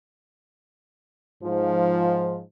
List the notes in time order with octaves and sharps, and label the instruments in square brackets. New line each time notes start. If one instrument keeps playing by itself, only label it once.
[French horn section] G#2 F3